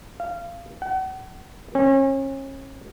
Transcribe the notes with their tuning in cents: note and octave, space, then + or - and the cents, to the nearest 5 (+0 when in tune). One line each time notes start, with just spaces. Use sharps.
F5 -20
F#5 +40
C#4 -35